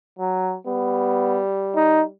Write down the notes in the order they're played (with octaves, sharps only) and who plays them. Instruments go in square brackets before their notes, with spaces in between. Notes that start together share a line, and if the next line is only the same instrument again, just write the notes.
[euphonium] F#3
[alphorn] G3 [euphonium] B3
[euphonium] D#4